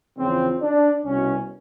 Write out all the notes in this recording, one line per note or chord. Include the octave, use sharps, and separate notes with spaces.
E2 C#3 F3 C4
D4
C2 B2 C#4